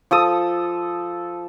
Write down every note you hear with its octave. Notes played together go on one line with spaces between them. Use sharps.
F3 A4 D#6